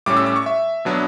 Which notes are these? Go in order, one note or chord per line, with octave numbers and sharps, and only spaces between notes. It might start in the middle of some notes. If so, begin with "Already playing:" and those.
A2 G3 C#4 D6
E6
D6
C#6
E5
B2 F#3 B3 D4